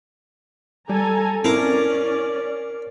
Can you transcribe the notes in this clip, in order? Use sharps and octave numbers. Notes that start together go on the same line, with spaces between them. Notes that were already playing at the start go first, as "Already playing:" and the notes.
G3 A4 G#5 A#5
C4 C#4 E4 A#4 D5 F5 A#5